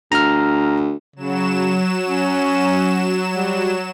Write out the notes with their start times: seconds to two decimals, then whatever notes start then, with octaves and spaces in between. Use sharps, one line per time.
0.12 D2 A#5 F6
1.16 C#3 F#3 E7
2.07 C#4
3.34 G3